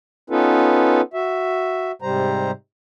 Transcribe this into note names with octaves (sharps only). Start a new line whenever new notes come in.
B3 C#4 D#4 F4 A4 B4
F#4 E5
G#2 C3 G3 C5 A#5